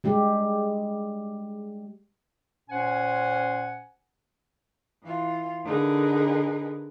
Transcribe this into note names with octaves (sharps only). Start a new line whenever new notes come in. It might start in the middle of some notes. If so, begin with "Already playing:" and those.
G3 G#3 G4
A#2 C#4 C5 F#5 G#5
E3 F4
D3 D#4 G#4 A#4 B4